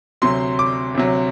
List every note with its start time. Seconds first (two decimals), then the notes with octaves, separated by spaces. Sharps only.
0.22 D2 C3 F#3 C6
0.59 D6
0.95 D2 C3 F#3